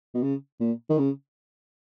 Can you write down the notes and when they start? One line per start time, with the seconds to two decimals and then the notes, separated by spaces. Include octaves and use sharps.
0.15 B2
0.23 C#3
0.60 A#2
0.90 D#3
0.99 C#3